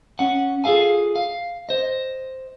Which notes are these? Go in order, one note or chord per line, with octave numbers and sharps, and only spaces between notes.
C#4 F#5
F4 G#4 A4 F5 G#5
F5
C5 D#5